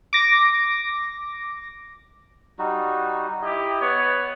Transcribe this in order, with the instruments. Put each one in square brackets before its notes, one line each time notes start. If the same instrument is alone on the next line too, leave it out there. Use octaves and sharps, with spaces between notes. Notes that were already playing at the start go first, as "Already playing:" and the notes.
[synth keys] D6 A#6
[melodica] G3 D#4 F#4
[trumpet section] E4 G4 [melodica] D#5
[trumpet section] B3 C#5